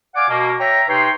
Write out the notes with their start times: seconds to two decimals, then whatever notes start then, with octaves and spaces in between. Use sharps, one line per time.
0.15 D5 F5 F#5 G#5 D6
0.29 B2 A#3
0.60 C#5 E5 G5 A#5
0.89 C3 D#4 B4 C#5 G5 C6